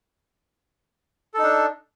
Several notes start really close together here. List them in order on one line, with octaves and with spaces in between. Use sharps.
A4 D#4 D4